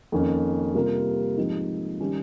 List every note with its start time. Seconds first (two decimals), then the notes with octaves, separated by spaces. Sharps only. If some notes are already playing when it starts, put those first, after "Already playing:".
0.12 F2 D#3 A#3 C#4
0.75 C3 G3 A#3 F4 A#4
1.37 G#2 F3 C4 D#4 G4
2.00 D#3 G3 C#4 G4